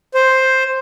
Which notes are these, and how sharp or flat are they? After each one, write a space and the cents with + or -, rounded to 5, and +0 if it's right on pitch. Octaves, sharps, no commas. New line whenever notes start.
C5 +5